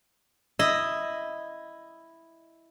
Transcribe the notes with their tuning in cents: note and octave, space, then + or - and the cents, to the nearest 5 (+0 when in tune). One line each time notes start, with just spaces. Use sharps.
E4 +0 D#5 +0